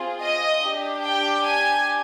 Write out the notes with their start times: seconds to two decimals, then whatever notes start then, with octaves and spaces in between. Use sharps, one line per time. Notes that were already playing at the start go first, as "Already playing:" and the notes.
Already playing: C4 F4 G#4
0.23 D#5
0.64 D4 G4
1.05 G5
1.47 G#5